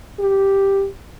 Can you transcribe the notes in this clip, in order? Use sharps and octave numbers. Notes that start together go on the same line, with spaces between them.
G4